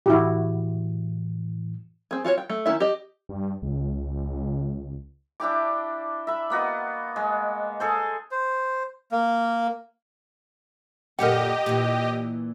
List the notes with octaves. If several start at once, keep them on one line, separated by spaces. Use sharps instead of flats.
A2 E3 E4 F#4 G4
C4 G#4
F4 F#4 G#4 C#5
G5
A3
D#3 C#4 E4 E5
G4 D#5
G2
C#2
D4 E4 G4 D6
E5 B5
A#3 B3 F#4 D#5
G#3
G#4 A4 C5
C5
A#3
F#2 A#2 D3 G4 A#4 D#5 F#5
A#2 E3